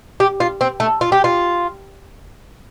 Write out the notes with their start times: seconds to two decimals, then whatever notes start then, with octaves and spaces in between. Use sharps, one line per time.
0.20 G4
0.40 F4
0.61 C4
0.80 A3
1.01 F4
1.12 G4
1.24 F4